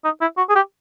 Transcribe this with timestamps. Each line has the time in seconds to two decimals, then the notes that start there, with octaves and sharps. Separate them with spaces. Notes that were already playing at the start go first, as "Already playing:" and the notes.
0.05 D#4
0.21 E4
0.37 F#4
0.50 G#4
0.56 G4